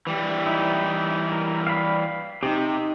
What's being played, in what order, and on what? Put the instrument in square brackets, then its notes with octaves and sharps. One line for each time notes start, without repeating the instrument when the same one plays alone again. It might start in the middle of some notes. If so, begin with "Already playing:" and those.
[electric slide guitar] E3 G3
[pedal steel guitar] D#4 E4
A#4
F5 B5
[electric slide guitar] C3 [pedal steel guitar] D#4 G4